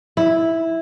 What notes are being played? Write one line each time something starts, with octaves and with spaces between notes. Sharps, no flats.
E4